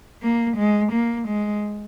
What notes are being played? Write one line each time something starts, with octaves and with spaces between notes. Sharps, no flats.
A#3
G#3
A#3
G#3